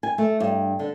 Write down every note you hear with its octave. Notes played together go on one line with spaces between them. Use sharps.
G#5
A3
G2
D3